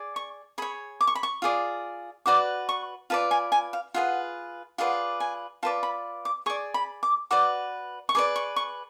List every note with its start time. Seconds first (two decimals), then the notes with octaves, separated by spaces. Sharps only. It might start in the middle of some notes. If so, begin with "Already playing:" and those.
Already playing: G#4 D5
0.16 C#6
0.58 G#4 C#5 B5
1.01 D6
1.07 C#6
1.15 B5
1.23 C#6
1.42 F4 G#4 D5
2.26 F#4 B4 D5 D6
2.69 C#6
3.10 F4 B4 D5 A5
3.31 G#5
3.52 G#5
3.73 F5
3.94 F4 G#4 B4 F#5
4.78 F4 G#4 B4 D5 F#5
5.20 G#5
5.63 F4 B4 D5 A5
5.83 B5
6.25 D6
6.46 G#4 D5 C#6
6.74 B5
7.03 D6
7.31 F#4 B4 D5 D6
8.09 C#6
8.15 G#4 B4 D5 D6
8.36 C#6
8.56 C#6